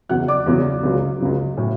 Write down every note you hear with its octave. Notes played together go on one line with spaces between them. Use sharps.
E2 C#3 F#3 F#5 F#6
D5 D6
E2 C#3 F#3
C#2 C#3 F#3
C#2 C#3 F#3
A2 F#3